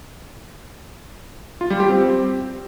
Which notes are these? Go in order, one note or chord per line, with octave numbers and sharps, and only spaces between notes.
F4
G3
G4
C4